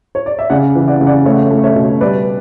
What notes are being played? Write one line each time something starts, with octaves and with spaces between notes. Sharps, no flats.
C#5
D5
E5
C#3 D5 F#5
E3
D5 F#5
C#3
D5 F#5
A3 C#5 E5
A3
C#5 E5
B2
G3 B4 D5